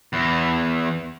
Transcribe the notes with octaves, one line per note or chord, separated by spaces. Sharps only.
E2